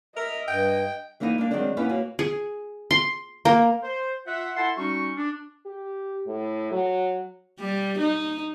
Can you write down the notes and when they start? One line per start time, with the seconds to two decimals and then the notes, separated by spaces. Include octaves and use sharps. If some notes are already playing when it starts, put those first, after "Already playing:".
0.17 A#4 D#5 E5
0.48 G2 G5
1.20 E3 A#3 D#4 E4 D#5
1.38 A#3 D4
1.51 D#3 E3 F#3 G#3 C4 D4
1.77 A#3 B3 C#4 D#4 E4 B4
1.89 A#3 F#4 B4 C#5
2.19 G#4
2.91 C6
3.45 A#3
3.83 C5
4.27 F4 E5 F#5
4.56 E4 A4 E5 F#5 A5 C6
4.77 G3 C#4 D#4 F#4 C#6
5.17 D4
5.66 G4
6.27 A2
6.71 F#3
7.59 G3
7.98 D#4